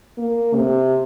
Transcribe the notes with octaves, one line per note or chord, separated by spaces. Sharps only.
A#3
C3